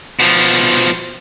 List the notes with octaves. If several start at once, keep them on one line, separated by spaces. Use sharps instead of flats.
B2 F3